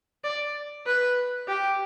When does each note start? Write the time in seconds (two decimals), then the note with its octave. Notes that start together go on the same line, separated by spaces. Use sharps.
0.24 D5
0.86 B4
1.48 G4